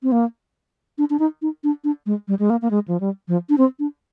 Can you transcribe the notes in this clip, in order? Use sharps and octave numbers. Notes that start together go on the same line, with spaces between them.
C4
A#3
D4
D4
D#4
D#4
D4
D4
G#3
G3
G#3
A#3
A#3
G#3
F3
G3
F3
D4
C4
D4